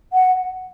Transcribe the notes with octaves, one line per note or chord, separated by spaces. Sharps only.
F#5